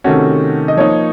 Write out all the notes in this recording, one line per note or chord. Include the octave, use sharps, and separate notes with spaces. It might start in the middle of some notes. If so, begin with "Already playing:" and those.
C3 D#3 A3 C#4 F#4
D#5
F3 A#3 D#4 C#5